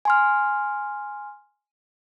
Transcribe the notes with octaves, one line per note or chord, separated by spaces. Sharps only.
G#5 C6 F6